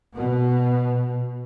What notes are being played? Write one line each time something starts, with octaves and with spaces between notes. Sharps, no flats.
B2